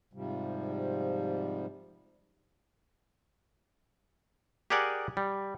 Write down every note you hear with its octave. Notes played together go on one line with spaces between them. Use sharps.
G#2 C3 F3 G3
G4 G#4 A#4 D5 F#5 G#5
G3